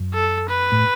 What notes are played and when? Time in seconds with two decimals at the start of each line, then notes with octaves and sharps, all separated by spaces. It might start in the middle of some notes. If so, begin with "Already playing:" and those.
Already playing: F#2
0.14 A4
0.49 B4
0.72 A2